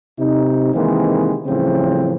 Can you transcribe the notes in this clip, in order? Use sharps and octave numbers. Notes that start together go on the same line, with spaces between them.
C3 D#4
C3 D#3 E3 G#3 A#3 C4
A2 C#3 E3 F3 G3 C4